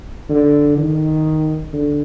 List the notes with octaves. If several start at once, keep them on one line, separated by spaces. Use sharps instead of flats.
D3
D#3
D3